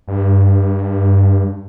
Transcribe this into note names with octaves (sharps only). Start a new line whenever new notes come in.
G2